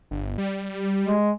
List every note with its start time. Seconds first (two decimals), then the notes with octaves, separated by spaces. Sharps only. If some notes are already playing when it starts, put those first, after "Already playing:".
0.11 G1
0.38 G3
1.00 G#3